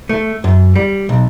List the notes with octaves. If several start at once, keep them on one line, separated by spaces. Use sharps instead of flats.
A3
F#2
G3
B1